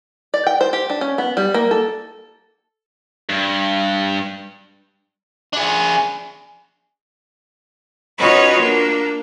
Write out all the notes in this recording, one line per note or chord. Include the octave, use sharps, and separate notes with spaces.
D5
G5
C5
G4
D4
C#4
B3
G3
A#3
A4
G2
D4 G#4
C#4 D#4 F4 F#4 B4 C#5
A#3 D4